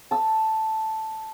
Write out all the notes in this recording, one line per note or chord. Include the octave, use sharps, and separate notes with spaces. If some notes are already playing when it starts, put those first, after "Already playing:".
A5 E6